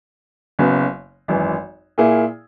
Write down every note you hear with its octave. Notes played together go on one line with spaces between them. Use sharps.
F#1 F#2 C#3 F#3 B3
G#1 F#2 E3
A#2 A#3 E4 G#4